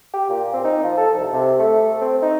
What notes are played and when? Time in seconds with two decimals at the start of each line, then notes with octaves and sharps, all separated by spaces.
0.14 G4
0.30 A#2
0.53 C4
0.64 D#4
0.84 F3
0.97 A4
1.17 C2
1.33 C3
1.59 A3
2.01 C4
2.22 D#4